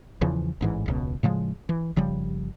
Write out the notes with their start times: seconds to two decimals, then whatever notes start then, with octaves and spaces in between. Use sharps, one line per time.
0.21 E2 C#3 E3 F3
0.61 A1 G#2 E3
0.86 E1 C#2 B2
1.23 A2 C#3 F3 G#3
1.69 E3
1.96 G1 C#3 F3 G3